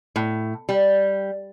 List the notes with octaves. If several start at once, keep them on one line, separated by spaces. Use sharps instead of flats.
A2
G3